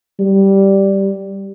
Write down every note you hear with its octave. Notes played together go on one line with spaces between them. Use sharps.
G3